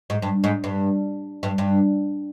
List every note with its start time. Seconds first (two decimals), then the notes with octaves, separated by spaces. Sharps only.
0.10 G#2
0.22 G2
0.44 G#2
0.64 G2
1.43 G2
1.58 G2